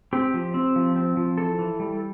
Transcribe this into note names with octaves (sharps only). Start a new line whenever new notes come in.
C4 G4
F3
C4
F3
C4
F3
E3 A4
E3
G3